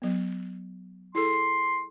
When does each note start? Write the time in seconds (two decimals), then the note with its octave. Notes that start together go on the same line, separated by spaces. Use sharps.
0.02 F#3 B3
1.15 E4 G#4 A4 C6